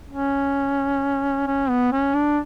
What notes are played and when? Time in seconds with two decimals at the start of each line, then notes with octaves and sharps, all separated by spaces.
0.10 C#4
1.47 C#4
1.70 B3
1.92 C#4
2.15 D4